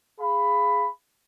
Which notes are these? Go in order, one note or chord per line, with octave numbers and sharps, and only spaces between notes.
G#4 F5 B5